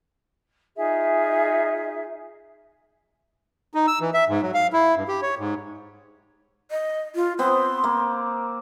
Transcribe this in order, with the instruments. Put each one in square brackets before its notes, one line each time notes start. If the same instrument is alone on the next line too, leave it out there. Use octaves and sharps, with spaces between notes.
[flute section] D#4 F4 G#4 E5
[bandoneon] D#4
E6
E3
E5
G#2
F#3
F5
E4
G2
G4
C#5
G#2
[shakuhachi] D#5
F4
[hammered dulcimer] B3 C4 [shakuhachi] C6
[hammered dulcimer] A#3